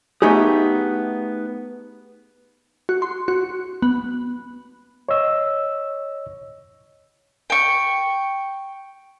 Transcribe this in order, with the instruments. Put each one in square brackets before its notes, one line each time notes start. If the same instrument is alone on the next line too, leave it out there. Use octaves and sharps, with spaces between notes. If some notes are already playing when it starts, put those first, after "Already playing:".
[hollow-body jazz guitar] A3 B3 D#4 G4 G#4
[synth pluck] F#4
C6
F#4
B3
[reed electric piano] C#5 D#5 E6
[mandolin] G5 C#6